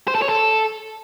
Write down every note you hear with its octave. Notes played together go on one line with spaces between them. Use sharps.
C5
A4
C#5
A4